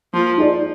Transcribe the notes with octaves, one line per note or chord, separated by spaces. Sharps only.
F3 A#3
D#4 G#4 D5